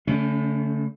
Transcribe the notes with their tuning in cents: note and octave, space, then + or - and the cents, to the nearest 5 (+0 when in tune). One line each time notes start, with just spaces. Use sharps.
D3 -45 A3 +0 C#4 +0